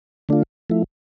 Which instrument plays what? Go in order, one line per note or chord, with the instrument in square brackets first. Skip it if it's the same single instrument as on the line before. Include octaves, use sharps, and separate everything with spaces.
[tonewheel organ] D3 A3 D4 F4
F3 A3 E4